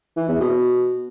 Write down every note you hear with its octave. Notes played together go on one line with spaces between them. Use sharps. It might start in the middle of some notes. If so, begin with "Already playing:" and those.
E3
E2
B2